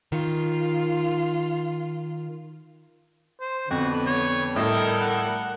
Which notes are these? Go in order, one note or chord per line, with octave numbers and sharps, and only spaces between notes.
D#3 F4
C5
F2 D3 B3 F#4
C#5
A2 G3 E4 A4 A#4 D#5
F#5